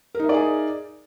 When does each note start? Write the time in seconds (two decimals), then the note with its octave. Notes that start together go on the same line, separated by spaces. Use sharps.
0.15 A#4
0.19 D#4
0.24 E5
0.29 D5
0.34 G#4